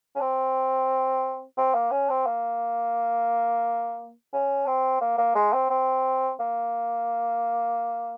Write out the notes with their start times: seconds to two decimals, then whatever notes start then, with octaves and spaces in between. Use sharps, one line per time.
0.16 C#4
0.20 C4
1.58 C4
1.74 A#3
1.91 C#4
2.10 C4
2.26 A#3
4.33 C#4
4.66 C4
5.01 A#3
5.18 A#3
5.35 G#3
5.53 C4
5.70 C4
6.39 A#3